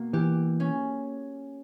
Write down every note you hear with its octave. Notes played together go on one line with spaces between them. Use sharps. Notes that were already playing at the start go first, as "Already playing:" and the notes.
Already playing: B2 A#3
E3 G4
C#4